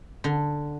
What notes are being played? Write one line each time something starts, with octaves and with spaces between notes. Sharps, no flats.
D3